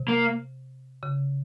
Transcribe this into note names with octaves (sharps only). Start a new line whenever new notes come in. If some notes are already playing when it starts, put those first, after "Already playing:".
Already playing: C3
A#3
C#3